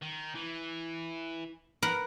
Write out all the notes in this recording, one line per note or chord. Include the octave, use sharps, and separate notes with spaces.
D#3
E3
A#4 B4 F#5